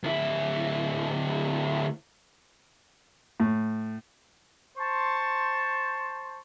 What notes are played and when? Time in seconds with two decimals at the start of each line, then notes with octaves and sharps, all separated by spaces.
0.04 D2 E4
3.40 A2
4.78 C5 A5 C6 C#6